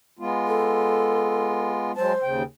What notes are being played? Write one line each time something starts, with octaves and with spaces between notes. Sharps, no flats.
G#3 B3 F4
A4
F#3 G#3 C5 A5
D#2 C#3 G5